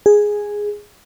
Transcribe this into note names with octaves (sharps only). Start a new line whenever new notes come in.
G#4